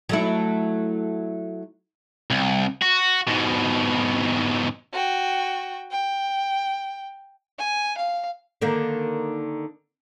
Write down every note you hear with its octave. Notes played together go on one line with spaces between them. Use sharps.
F#3 A3 E4
C2
F#4
G#2 B2
F#4 G5
G5
G#5
F5
D3 D#3 A#3